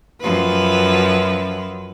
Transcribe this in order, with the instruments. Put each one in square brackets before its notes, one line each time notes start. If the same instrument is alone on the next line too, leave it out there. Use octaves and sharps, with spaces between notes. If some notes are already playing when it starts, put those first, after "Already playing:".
[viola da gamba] F#2 F3 B4